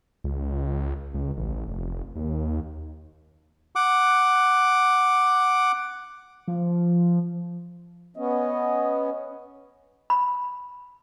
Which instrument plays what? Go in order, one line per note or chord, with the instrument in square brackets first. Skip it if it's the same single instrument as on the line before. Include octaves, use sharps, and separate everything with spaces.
[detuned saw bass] C#2
C#2
A1
F1
D#2
[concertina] F#5 D6
[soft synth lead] F3
[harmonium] B3 C#4 [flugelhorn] D#5
[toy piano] B5